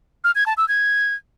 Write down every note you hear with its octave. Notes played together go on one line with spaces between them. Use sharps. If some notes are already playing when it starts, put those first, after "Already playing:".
F6
G#6
A5
E6
G#6